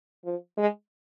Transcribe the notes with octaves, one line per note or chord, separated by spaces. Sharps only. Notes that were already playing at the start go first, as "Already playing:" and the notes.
F3
G#3